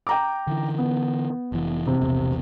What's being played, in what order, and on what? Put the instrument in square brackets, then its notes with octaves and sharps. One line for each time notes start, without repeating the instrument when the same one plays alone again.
[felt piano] G5 A#5 D6
[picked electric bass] D3 E3
[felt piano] B3
[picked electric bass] F1 E3
[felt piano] C3
[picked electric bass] E1 A#1 E2